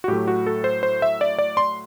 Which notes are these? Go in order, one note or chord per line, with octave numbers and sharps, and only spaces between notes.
F#4
A2 F#3 A3 G4
F#4
A4
C5
C5
E5
D5
D5
C6